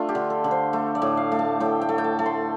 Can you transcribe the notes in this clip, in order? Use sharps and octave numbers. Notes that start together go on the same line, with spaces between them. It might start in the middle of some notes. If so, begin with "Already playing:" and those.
Already playing: A3 D4 F4 A4
G4
D3
A4
D3
C5
A3
D5
A2
F5
A3
A5
A2 G5
G5
A3
G5
A5
A3
C6